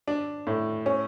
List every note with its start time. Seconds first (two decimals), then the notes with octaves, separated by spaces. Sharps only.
0.08 D4
0.47 A2
0.86 C#4